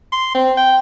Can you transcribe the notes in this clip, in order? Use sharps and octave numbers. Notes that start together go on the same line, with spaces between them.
C6
C4
G5